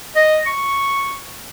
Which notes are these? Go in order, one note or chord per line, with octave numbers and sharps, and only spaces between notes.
D#5
C#6